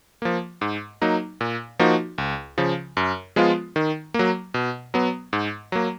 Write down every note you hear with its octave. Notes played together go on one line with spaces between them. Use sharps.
F3 A#3
G#2
F#3 A#3 D#4
A#2
F3 A#3 D#4 F#4
C#2
C#3 F3
F#2
F3 G#3 B3 F4
D#3
F#3 A#3
B2
F#3 B3
G#2
F#3 A#3